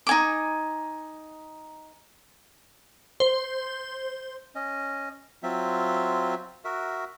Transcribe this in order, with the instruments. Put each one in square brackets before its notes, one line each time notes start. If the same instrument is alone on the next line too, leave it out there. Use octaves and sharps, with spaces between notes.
[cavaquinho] D#4 G#5 D6
[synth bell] C5
[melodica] C#4 D#5
F#3 C4 F4 E5
F#4 A#4 E5